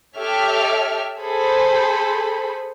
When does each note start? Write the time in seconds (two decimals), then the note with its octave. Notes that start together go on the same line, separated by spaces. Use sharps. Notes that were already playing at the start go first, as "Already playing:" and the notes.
0.17 G4 A4 C#5 E5 F6
1.20 G#4 A4 C5 B5